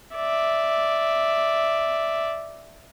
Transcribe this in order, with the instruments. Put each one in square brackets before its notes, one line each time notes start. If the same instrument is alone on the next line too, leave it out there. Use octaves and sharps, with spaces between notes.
[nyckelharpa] D5 E5